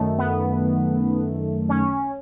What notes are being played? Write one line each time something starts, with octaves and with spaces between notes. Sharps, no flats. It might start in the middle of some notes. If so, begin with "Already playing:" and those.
Already playing: F#2 D#3 A3
B3
C#4